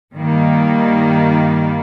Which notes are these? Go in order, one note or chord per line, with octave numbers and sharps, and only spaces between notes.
G2 D#3 G3 A#3